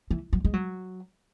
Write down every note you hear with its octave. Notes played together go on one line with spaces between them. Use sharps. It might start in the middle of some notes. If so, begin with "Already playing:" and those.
E3
F#3
G#3
F#3